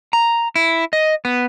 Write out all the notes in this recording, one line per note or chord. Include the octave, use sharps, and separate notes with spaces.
A#5
E4
D#5
B3